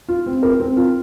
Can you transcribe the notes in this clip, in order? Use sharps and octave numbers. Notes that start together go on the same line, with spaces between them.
F4
C4
A#4
C4
F4